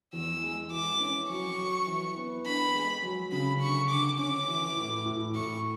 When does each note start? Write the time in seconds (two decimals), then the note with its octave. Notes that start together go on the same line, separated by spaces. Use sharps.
0.13 E2 E6
0.43 G#3
0.71 E3 D6
1.00 C#4
1.29 F#3 C#6
1.58 F#3
1.87 E3
2.16 B3
2.45 D4 B5
2.74 G#3
3.03 F#3
3.32 C#3 B5
3.60 D3 C#6
3.89 D3 D6
4.18 C#4 D6
4.48 E3
4.77 A2
5.05 A2
5.35 A2 C#6